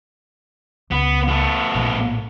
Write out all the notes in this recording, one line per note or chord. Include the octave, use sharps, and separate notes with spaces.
C#2 B3
A3 B3
A#1 A2